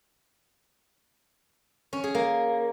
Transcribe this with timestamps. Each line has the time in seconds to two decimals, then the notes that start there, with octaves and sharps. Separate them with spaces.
1.93 C#4
2.04 G#4
2.15 A#3